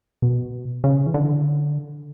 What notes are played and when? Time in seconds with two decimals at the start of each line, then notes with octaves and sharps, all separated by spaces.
0.22 B2
0.84 C#3
1.06 E3
1.14 D3